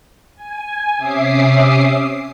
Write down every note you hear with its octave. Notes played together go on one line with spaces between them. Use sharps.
G#5
C3 C#4 E5 D6 D#6 C7